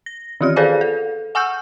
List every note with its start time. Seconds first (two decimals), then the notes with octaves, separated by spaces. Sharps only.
0.06 A#6
0.41 D#3 E3 F4 G4 F6
0.56 G#4 A4 B4 C5 D5 F5
0.81 A4
1.35 F#5 G#5 C#6 E6 F6 G6